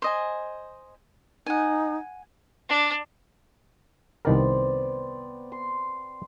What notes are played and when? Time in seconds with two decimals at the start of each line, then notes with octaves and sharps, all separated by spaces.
0.02 C5 D#5 G#5
1.46 D#4 F#5 G#5
2.69 D4
4.25 C2 D#3 B3 C4 A#4 D5
5.52 C6